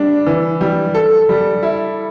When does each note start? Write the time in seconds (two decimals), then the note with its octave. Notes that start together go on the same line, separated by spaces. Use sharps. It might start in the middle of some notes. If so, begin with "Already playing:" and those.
Already playing: G3 D4
0.26 E3
0.61 G3
0.95 A4
1.29 G3
1.63 E4